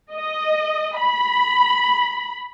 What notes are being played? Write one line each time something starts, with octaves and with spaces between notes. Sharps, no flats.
D#5
B5